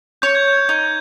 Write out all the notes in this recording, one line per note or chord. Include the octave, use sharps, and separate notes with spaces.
C#5 G6
G#6
G6
D#4